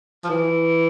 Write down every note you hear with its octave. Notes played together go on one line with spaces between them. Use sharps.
F3
E3